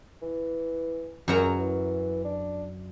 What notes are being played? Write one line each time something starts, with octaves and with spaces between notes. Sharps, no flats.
E3
C#2 F#2 F#3 A#5
E3
D4